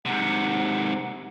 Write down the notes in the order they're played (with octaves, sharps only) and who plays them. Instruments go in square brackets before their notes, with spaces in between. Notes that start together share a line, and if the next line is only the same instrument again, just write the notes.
[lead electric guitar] G#2 C3 [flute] F#5